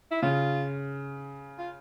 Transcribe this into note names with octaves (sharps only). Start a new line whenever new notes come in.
E4
C#3 C#4 F4
F4